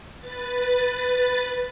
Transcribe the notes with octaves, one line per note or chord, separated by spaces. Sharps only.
B4 A6